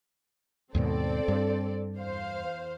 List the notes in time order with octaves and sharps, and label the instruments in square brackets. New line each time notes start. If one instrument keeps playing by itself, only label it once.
[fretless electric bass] D#2 G#2 B2 [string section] C4 A4 D5
[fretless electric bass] G2
[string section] E2 C5 F5